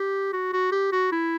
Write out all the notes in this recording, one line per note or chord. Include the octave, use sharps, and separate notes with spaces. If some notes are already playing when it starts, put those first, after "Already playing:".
Already playing: G4
F#4
F#4
G4
F#4
E4